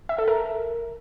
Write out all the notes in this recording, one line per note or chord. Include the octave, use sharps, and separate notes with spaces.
E5
A4
A#4